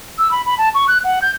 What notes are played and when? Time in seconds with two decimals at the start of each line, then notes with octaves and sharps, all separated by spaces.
0.18 E6
0.31 B5
0.46 B5
0.58 A5
0.75 C#6
0.88 F#6
1.04 F#5
1.22 G6